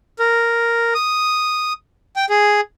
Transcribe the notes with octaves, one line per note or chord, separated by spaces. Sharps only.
A#4
D#6
G5
G#4